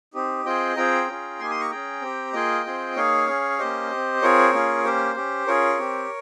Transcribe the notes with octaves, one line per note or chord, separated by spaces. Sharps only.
C4 D#4 G4
C4 F4 G#4 D#5 G5
C4 F4 G#4 G5 A#5
C#4 F4 G#4
A#3 D#4 G4 G#5 C6
C6 D#6
A#5 C#6
C#4 G#4 G5 A#5
C4 G4
A#3 F4 G#4 D#5 G5
C4 F4 G#4
A#3 D#4 G#4 C#5 F5
C#4 G#4
A#3 C#4 G4 C5 D#5
C4 G4
C4 F4 G#4 A#4 C#5
A#3 C#4 F4 G#4
A#3 C#4 G4 C5
C#4 G4
C#4 F4 G#4 A#4 C#5
C4 G4